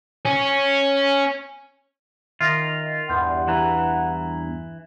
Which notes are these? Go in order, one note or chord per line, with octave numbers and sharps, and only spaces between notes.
C#4
D#3 F4 E5 A#6
E2 G2 F#5 C6 G6
E3 A#5